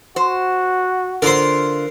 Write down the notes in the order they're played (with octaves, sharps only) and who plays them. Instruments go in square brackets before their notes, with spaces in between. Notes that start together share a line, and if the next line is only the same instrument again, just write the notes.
[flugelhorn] F#4 [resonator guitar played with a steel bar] C5
[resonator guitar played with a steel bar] D3 F4 [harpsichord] A#4 C5